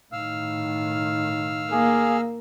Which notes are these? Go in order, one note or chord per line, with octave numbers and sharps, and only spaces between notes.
A2 D#3 F5 E6 F6
A#3 G#4